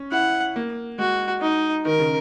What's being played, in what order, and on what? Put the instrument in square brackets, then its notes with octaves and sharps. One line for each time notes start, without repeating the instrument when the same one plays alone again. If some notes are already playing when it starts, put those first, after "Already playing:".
Already playing: [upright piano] C#4
[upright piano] E4 [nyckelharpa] F#5
[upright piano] A#3
[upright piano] G#3 [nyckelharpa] F#4
[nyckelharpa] D#4
[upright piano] D#3 [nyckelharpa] A#4
[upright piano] C#3